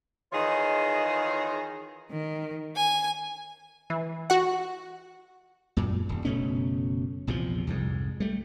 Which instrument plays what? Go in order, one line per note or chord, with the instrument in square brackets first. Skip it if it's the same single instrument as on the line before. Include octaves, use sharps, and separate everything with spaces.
[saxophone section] D#3 E3 F4 G#4 C#5 D#5
[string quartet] D#3
G#5
[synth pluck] E3
F#4 F#5
[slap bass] F#2 A#2
D#1
F#1 B2 A3 C#4
A#1 E2 C3 F3
C2 F2 G#2
G3 A3